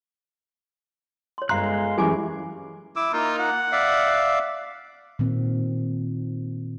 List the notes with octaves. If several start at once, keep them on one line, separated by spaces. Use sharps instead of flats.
C#5 C6
G1 G#3 F5 A#5 C6 F#6
F#2 E3 G#3 G4 G#5 D6
E4 D6 E6
A#3 D#4 F4
F#5
D5 E5 F5
A#2 D#3 C4